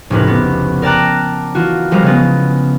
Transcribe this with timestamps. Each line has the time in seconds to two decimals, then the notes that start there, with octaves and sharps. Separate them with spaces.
0.10 F1 C#2 A2 A#4 B4
0.27 B3
0.82 A#4 D5 G5 A5 A#5 F#6
1.55 E3 F4 F#4
1.91 F3 G3 G#3 B3 A#4 C5
2.03 C#3 B3